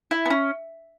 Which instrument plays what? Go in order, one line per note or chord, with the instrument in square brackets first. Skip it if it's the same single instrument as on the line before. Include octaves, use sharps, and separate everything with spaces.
[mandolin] E4
B3
C#4